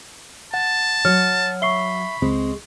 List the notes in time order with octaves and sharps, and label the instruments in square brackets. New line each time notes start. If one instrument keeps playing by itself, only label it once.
[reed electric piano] F#5 [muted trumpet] A5
[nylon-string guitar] F#3 C#5 [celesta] F6
[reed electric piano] E5 [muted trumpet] B5 [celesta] C#6 C7 G7
[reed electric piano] C#2 C4 [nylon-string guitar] G#3